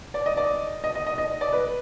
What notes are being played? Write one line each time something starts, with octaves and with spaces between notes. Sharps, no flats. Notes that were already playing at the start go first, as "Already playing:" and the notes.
D5
D#5
D5
D#5
D#5
D#5
D#5
D5
B4